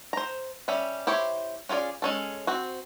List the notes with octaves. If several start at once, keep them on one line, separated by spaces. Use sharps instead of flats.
C5 A#5
G3 C#4 E5
E4 G4 C5 C#5
C#4 F4 G#4 D5
G#3 C#4 A4
C4 F#4